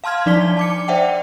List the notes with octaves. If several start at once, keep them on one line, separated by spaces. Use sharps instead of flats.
F5 A5 C6 F6 G#6
F3 D4 D#4 D5 B6 G7
A5 D6 C#7
C5 D5 E5 F#5 G5